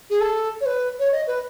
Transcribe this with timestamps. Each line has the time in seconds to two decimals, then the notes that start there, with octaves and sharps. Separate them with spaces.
0.10 G#4
0.20 A4
0.61 C#5
0.66 B4
0.99 C#5
1.12 D#5
1.27 B4